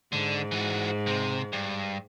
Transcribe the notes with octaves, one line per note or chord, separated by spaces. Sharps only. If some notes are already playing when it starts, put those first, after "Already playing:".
G#2 D3
E3 F#4
C3
G2